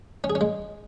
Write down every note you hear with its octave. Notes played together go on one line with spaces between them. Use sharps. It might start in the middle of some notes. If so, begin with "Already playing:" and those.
C#4
G#4
C#4
G#3